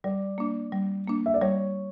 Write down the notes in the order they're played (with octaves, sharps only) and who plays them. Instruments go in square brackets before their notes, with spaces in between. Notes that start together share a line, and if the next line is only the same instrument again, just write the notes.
[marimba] G3 [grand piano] D5
[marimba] A#3 D4
G3
A#3 D4
[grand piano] E5
D5
[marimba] G3 [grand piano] C#5